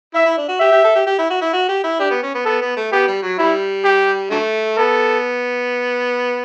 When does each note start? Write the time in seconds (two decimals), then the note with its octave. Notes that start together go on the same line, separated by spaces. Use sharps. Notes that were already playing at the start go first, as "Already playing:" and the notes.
0.14 E4 E5
0.26 E4
0.37 D4
0.48 F#4
0.60 G4 E5
0.72 G4
0.84 A4
0.95 G4
1.07 G4
1.19 E4
1.30 F#4
1.41 E4
1.53 F#4
1.69 G4
1.84 E4
1.99 D4 G4
2.11 B3
2.23 C#4
2.35 B3
2.45 B3 A4
2.61 B3
2.77 A3
2.92 B3 G4
3.07 G3
3.23 F#3
3.38 G3 E4
3.84 G4
4.31 D3 F#3 A3
4.77 B3 A4